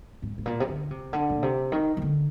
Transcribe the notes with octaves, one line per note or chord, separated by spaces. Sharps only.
G#2
G#2
A#2
C3
D3
C3
D3
A#2
C3
D#3
D#3
D3